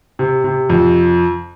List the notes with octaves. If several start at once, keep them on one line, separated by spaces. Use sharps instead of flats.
C3
C3
F2